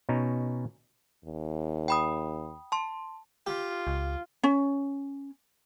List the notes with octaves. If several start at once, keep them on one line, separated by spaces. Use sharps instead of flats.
B2 C#4 D#4 A#5
D#2
G5 B5 D#6
A5 C6
F4 G4
C#2
C#4